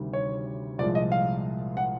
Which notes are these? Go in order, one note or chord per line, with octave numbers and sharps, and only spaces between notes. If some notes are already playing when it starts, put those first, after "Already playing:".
Already playing: D2 C3 D#3 G3
C#5
C2 A#2 F3 G#3 D5
D#5
F5
F#5